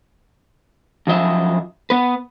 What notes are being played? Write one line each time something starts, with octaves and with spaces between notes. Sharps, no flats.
F#2 F3 D#5 E5
B3 B4